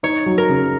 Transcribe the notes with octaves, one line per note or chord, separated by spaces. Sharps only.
D#4 C#5
F#3
A#4
C#3